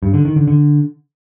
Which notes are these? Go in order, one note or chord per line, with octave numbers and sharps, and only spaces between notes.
G2
D3
D#3
D3
D3